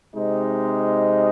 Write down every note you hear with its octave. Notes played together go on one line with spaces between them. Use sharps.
C3 G#3 C4 D#4